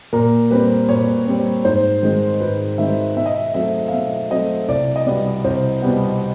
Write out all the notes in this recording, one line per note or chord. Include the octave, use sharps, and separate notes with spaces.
A#2 A#4
G3 C4 B4
A#2 C#5
G3 C4
G#2 C5
D#3 G#3 C4
G#2 B4
D#3 G#3 C4 E5
B2 E5
D#5
E5
F#3 A3 C4 E5
F5
B2 E5
F#3 A3 C4 D#5
C2 D5
D#5
B2 G3 B3 D5
C2 C5
B2 G3 B3